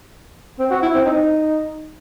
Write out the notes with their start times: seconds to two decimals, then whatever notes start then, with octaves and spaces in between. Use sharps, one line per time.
0.59 C4
0.71 F#4
0.82 E4
0.94 C4
1.05 D#4